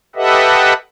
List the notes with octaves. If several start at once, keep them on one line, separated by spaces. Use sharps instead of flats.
G4 A4 B4 D#5 E5 F#5